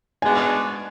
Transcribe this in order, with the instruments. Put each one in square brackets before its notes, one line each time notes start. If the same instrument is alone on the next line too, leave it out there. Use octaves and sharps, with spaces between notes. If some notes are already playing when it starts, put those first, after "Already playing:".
[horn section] G#2 G#3 B3 D4 F#4 [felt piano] G#5